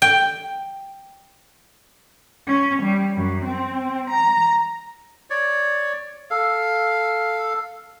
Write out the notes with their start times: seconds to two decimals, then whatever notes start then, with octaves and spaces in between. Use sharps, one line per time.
0.02 G5
2.47 C#4
2.82 G3
3.15 F#2
3.45 C4
4.11 A#5
5.30 C#5 D5
6.31 A4 F5